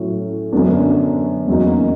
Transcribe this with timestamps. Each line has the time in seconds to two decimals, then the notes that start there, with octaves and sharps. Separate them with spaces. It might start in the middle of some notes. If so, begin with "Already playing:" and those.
Already playing: A2 F#3 A3 C#4 E4
0.52 F#2 D3 F#3 B3 D4
1.47 E2 C#3 F#3 A#3 D#4